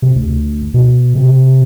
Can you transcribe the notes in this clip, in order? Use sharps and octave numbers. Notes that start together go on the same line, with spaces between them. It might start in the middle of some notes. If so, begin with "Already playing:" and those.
C3
D2
B2
C3